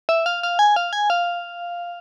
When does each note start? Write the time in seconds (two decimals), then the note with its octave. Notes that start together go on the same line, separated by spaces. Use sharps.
0.09 E5
0.26 F5
0.43 F5
0.59 G#5
0.76 F5
0.93 G#5
1.10 F5